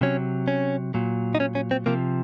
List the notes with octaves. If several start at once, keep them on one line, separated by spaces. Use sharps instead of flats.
C3 F#3 C#4
C#4
A#2 F#3
D#4
C#4
C#4
C4
C3 F3 A#3